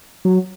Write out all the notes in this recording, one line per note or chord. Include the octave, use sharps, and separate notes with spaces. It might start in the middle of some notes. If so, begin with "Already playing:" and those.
F#3